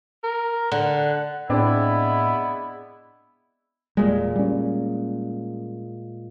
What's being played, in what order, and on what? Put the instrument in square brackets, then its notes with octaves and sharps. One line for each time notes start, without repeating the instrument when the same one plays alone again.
[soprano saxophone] A#4
[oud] D3 [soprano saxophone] F#5
[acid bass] A2 [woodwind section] G#3 B3 E4 [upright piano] C4 D4
[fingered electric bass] E1 G3 [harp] A#2 G#3
[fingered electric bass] G3 C#4